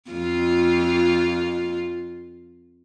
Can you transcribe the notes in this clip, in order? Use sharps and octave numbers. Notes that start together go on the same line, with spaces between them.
F2 F4